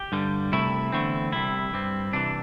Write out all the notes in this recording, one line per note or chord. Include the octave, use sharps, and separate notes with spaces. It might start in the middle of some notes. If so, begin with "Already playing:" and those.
Already playing: G4
G2 D3 G3
C2 C3 A3 E4
E2 D3 A3 C4
C2 C3 G3 E4
G2 G3 C4
C2 C3 E3 D4